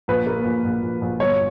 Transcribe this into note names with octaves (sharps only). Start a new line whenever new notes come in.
A#1 B4
A#3
A#1
A#1
A#1
A#1
G1 C#5